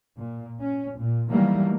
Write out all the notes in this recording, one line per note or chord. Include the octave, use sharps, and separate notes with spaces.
A#2
C#4
A#2
D#3 E3 F#3 G3 A3 A#3